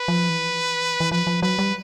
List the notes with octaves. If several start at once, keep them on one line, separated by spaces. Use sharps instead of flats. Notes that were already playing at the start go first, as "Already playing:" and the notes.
Already playing: B4
F3
E3
E3
F3 B4
F3
F#3 B4
G3